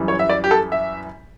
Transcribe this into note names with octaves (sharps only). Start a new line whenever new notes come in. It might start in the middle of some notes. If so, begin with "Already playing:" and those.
Already playing: F#2 E3 G3
C#5
E5
D5
G4
A4
E5